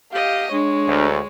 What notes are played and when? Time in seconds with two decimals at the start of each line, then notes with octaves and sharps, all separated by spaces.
0.13 G4 D#5 F5
0.52 G#3 D4 C#5
0.87 D2